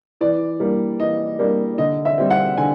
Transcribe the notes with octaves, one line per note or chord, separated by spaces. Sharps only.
E3 D5
G3 A#3 D4
E3 D#5
G3 A#3 D4
D3 D#5
E5
G3 C4
F#5
D3 G#5